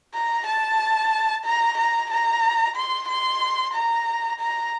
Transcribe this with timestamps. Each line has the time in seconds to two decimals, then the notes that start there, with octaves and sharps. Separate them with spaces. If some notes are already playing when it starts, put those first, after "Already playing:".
0.14 A#5
0.47 A5
1.45 A#5
1.78 A#5
2.11 A#5
2.76 C6
3.09 C6
3.74 A#5
4.40 A#5